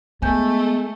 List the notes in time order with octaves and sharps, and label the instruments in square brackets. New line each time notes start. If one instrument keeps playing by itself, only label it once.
[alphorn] G#3 [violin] A3 [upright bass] B3 [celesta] G#5 G6